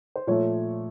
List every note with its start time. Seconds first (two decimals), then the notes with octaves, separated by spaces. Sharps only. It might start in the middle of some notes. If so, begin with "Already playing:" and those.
0.16 C5
0.27 A#2 F3 A3 C#5